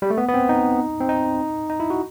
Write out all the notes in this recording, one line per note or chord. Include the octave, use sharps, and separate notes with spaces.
G3
A3
B3
B3
C4
D#4
C4
D#4
D#4
E4
F#4